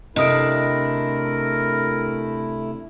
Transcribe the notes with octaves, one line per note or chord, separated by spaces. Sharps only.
C3 A3 D4 E4 A#4 D#5 D#6 D7